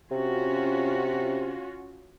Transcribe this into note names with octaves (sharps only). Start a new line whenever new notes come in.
C3 C#4 F4 F#4